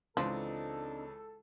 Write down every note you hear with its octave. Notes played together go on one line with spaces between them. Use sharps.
C#2 E3 F3 G#3 C4 D4 D#4 A4